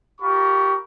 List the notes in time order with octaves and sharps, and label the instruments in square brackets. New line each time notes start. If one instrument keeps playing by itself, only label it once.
[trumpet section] F4 G4 A#4 B5 C#6